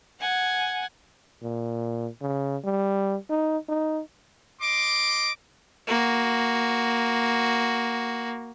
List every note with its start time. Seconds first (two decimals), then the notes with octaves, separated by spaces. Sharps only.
0.20 F#5 G#5
1.42 A#2
2.21 C#3
2.64 G3
3.30 D#4
3.69 D#4
4.61 D#5 C6 D6
5.87 A#3 F#4